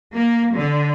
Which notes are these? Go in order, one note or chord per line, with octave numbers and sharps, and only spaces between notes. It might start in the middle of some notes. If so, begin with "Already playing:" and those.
A#3
D3